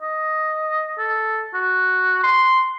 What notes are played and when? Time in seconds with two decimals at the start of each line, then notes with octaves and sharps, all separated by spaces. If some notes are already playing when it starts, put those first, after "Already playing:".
0.02 D#5
0.99 A4
1.54 F#4
2.23 C6